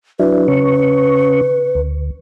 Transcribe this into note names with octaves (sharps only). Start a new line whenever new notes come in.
F#3 D4 E4 B4
C#3 C#4 C#6
D2